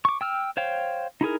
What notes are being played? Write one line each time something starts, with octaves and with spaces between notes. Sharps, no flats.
C#6 D6
G5 E6 F6
C5 C#5 F5 G5
D#4 E4 G#4 A#4